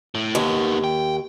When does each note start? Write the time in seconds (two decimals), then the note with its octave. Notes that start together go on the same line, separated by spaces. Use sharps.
0.15 A2
0.35 D#2 D#3 B3
0.84 G5